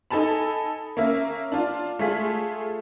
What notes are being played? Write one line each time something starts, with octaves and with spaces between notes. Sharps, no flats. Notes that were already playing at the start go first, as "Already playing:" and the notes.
D#4 A4 G#5 A5 B5
A#3 C#4 E5
D4 F4
A3 F4 G#4 B6